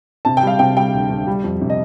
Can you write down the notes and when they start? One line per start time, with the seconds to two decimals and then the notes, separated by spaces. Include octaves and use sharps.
0.25 C3 A5
0.37 G5
0.43 G3 F5
0.59 C3 G5
0.76 G3 G5
0.94 D2
1.10 D2
1.27 G3
1.43 F2
1.62 C3
1.70 D#5